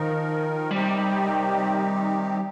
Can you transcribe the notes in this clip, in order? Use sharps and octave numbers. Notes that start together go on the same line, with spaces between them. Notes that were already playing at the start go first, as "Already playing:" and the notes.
Already playing: D#3 F3 D#4 A#4
C3 D#3 G3 C4 D#4 G4